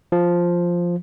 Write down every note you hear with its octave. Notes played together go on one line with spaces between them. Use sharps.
F3